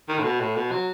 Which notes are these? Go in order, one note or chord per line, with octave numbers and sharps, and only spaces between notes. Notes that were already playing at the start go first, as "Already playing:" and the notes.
D#3
A2
B2
A2
B2
F#3